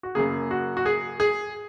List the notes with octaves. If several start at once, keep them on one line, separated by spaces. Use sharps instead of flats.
F#4
F#2 C#3 A#3 G#4
F#4
F#4
G#4
G#4